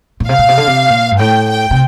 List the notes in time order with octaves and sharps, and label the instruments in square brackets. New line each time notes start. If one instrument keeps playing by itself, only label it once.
[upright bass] A#2
[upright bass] C3 [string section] F5
[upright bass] A#2
C3
D3
C3
A#2
G2
[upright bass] A2 [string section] G5
[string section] G5
[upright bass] C3